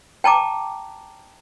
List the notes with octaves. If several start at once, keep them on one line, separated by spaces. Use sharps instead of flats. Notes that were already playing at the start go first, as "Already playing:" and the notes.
G5 A5 A#5 D6